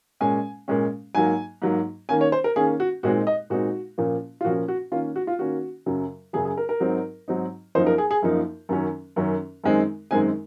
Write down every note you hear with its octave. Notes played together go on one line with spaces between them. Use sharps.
A#2 G#3 C#4 G#5
A#2 G#3 C#4
G#2 F#3 A#3 G#5
G#2 F#3 A#3
D#3 A#3 C#4 G#5
C#5
C5
A#4
D#3 A#3 C#4 G#4
F#4
A#2 G#3 C4 D#4 F#4
D#5
A#2 G#3 C4 D#4 F#4
A#2 F3 A#3 C#4
F4
A#2 F3 A#3 C#4 F#4
F#4
D#3 A#3 C#4 F4
F#4
F4
D#3 A#3 C#4 F#4
F#2 C#3 F#3
F#2 C#3 F#3 G#4
G#4
A#4
A#4
G#2 F#3 C4 D#4
G#2 F#3 C4 D#4
F#2 F3 A#3 D#4 C5
A#4
G#4
G#4
F#2 F3 A#3 D#4
F#2 D#3 F#3 C#4
F#2 D#3 F#3 C#4
F#2 D#3 G#3 C4 D#4
F#2 D#3 G#3 C4 D#4 G#5